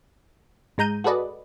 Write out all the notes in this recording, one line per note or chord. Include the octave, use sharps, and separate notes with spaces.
G#2 G#3 A#5 G6 D#7
F#4 G#4 A4 B4 D5 D#5